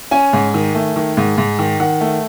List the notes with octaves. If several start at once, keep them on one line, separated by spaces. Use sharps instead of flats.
C#4 G#5
G#2
D#3
A3
D#3
G#2
G#2
D#3
D#3 F#5
A3